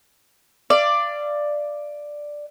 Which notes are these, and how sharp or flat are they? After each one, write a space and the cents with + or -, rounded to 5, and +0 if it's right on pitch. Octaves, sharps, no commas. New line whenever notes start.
D5 +5 F5 -30